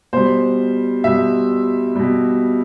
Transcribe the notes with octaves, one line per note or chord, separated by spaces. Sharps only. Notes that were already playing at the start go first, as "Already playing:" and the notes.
B2 G3 C5
B2 G3 E5
B2 G3